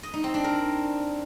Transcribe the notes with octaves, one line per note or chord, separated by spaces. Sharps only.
D#5
D#4
C4
D4
A#4